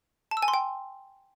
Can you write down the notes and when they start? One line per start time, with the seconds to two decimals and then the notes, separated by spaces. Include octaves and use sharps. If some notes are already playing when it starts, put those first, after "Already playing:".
0.31 A5
0.37 E6
0.42 G#5
0.48 C6
0.54 G5